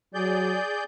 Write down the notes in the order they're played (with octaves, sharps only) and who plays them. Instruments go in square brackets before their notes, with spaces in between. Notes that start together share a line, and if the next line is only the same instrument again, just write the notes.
[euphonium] F#3 [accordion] G#4 D5 G6